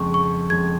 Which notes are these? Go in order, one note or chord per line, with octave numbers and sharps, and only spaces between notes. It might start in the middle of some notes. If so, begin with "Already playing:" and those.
Already playing: F2 C#3 G#3 C#6
C#6
F2 C#3 G#3 G#6